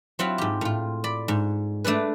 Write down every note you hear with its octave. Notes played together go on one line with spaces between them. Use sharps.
F#3 C4 E4 F4 B5
G#2 G4
A2 F4
D5 B5
G#2
A3 D4 A4 B4